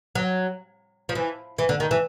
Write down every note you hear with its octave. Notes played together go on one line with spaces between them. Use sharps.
F#3
F3
E3
E3
D3
D#3
E3